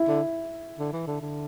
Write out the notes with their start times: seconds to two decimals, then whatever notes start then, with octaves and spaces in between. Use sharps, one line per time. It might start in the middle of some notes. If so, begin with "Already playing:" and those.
Already playing: E4
0.08 D3
0.79 D3
0.93 E3
1.07 D3
1.21 D3